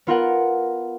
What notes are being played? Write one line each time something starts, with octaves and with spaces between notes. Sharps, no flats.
B3 F4 A#4 F#5